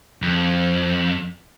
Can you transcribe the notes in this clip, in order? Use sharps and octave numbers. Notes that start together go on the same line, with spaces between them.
F2